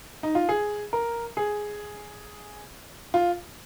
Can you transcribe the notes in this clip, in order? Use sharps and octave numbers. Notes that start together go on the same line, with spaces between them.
D#4
F4
G#4
A#4
G#4
F4